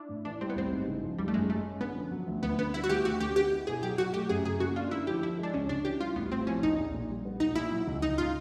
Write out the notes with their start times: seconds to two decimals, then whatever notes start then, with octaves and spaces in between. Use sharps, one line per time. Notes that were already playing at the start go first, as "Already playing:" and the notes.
Already playing: D4 E4
0.09 A2
0.25 E3 D4
0.41 G3 C4
0.50 B3
0.56 A1 C4
0.72 G#2
0.88 C#3
1.03 F3
1.18 G#1 G3
1.28 A3
1.34 F#2 G#3
1.50 G#3 A3
1.65 C#4
1.81 D3 B3
1.96 F3
2.11 F#3
2.27 D2
2.43 D2 B3
2.59 D3 B3
2.73 G3 E4
2.84 F#4
2.89 D2 G4
3.05 D2 F#4
3.20 D3 G4
3.36 B3 G4
3.51 E4
3.67 B2 G#4
3.82 F#3 G4
3.98 F#3 F#4
4.13 A3 G4
4.29 F#2 G#4
4.44 C#3 G#4
4.60 A#3 F#4
4.76 D4 F4
4.91 D3 E4
5.07 F3 G4
5.22 F3 E4
5.38 G#3 D4
5.54 C#2 C#4
5.69 C#3 D4
5.85 E3 G4
6.00 G3 F4
6.16 A1 B3
6.32 A2 C4
6.46 F3 C#4
6.63 A#1 D#4
6.79 A#1
6.94 A#2
7.10 G3
7.25 B3
7.40 B1 D#4
7.55 A#2 E4
7.71 F#3
7.87 C#2
8.02 C#2 D#4
8.18 C#3 F4